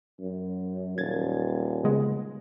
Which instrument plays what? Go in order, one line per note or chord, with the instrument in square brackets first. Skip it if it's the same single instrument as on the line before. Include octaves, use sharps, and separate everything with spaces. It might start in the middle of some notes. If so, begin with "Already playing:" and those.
[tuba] F#2
[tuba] D#1 [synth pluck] G#6 A6
[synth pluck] C#3 G#3 B3